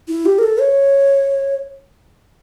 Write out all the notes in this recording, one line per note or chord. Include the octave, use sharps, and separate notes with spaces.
E4
G4
A#4
A4
C#5